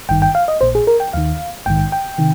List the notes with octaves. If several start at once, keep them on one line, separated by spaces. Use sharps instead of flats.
G#1 G2 D#3 G5
G5
F5
D#5
A#1 A#2 C5
G#4
A#4
G5
D#2 D#3 F5
A#1 G#2 D#3 G5
G5
C3 D#3